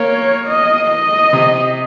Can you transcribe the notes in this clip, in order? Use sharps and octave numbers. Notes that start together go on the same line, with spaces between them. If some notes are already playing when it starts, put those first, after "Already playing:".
Already playing: A#3 C#5
D#5
D#5
C3